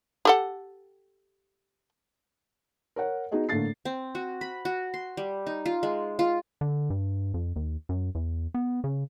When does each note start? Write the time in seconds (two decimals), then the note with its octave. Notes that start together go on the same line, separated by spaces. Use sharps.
0.25 G4 A4 F#5
2.96 A#4 C#5 F#5
3.31 B3 D#4 F#4 G#4 D#5
3.49 A2 D3 A3 A#3 A6 C7
3.85 C4
4.15 F#4
4.41 B5
4.65 F#4
4.94 C6
5.17 G3
5.47 D#4
5.66 F4
5.83 G#3
6.19 F4
6.61 D3
6.90 G2
7.34 F2
7.56 D#2
7.89 F#2
8.15 E2
8.54 B3
8.84 C#3